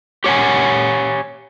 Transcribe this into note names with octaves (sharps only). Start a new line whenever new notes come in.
G4 C#5 F#5 G#5